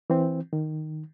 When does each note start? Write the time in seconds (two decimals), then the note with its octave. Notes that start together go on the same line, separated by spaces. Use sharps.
0.10 E3 C4
0.53 D#3